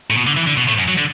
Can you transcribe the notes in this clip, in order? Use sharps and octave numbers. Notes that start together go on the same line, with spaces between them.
A2
B2
D3
E3
D3
B2
A2
F#2
F#3
D3